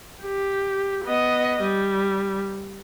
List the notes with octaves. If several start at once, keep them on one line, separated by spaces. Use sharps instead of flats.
G4
B3 D#5
G3